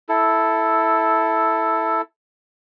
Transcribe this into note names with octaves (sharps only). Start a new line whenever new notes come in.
E4 A4